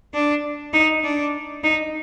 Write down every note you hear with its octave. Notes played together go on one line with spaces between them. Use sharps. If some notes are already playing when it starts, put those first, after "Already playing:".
D4
D#4
D4
D#4